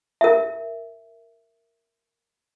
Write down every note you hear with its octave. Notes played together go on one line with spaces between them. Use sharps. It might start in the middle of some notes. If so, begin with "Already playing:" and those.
A#4 E5